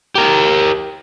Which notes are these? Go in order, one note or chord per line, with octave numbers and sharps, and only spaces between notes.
G4 A#4